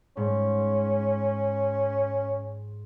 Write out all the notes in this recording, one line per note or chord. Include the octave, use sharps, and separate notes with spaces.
G#2 C#4